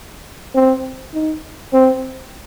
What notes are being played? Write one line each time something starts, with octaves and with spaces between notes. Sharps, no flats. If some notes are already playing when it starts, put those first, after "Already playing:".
C4
D#4
C4